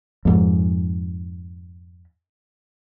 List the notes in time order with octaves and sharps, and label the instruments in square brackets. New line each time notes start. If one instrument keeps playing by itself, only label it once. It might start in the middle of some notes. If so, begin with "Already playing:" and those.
[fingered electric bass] F2 G#2